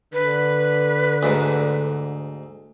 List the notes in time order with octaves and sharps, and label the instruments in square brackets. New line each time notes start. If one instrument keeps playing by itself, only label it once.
[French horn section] D3 [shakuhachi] B4
[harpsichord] D2 G#2